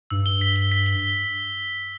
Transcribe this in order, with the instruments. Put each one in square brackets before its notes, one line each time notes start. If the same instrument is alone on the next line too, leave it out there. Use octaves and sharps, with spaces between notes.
[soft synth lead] G2 [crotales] E6
[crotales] G7
B6
G7
B6
G7